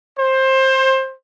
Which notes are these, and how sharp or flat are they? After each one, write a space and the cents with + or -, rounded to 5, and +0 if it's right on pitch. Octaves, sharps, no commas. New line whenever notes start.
C5 +20